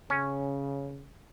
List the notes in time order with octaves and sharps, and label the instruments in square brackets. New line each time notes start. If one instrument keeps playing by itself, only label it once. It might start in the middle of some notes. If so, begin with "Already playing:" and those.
[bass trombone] C#3 [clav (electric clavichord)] C#4